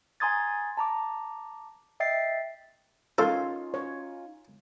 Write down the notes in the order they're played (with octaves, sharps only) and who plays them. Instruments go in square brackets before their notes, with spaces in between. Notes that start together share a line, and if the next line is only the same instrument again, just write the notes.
[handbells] G#5 A#5 C6 D#6 G#6 A6
A5 A#5 D6
D#5 E5 G5 A6 C7
[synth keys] C#4 D#4 F4 [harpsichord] A4 [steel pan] C#5 F5 C6
[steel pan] C#5